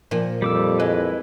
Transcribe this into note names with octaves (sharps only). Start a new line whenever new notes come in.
A#2 F3
F2 G3 D6 E6
G#3 E4 B4